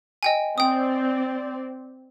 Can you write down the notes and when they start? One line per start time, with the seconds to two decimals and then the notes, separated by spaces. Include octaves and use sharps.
0.23 D#5 G5 G#5
0.58 C4 D5 G5 D#6